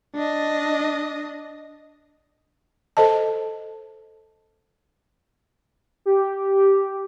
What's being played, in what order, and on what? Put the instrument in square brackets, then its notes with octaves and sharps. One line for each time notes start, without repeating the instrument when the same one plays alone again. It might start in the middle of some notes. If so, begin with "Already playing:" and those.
[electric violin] D4 D#5
[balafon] A4 C5 D#5 A5
[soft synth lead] G4